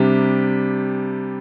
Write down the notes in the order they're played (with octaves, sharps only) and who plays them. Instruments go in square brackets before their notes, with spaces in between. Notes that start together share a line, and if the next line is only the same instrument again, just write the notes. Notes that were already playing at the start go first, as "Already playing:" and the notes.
Already playing: [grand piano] C3 G3 D4 G4